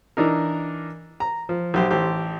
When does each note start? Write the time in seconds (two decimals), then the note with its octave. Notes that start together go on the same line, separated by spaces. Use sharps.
0.17 E3 D4 D#4 A#4
1.20 A#5
1.49 F3
1.74 B1 G4 C5
1.90 A1 G4 C5